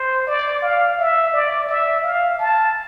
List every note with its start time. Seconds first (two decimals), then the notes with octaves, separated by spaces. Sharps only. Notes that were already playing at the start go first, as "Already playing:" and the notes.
Already playing: C5
0.27 D5
0.62 F5
0.98 E5
1.33 D5
1.68 E5
2.03 F5
2.39 A5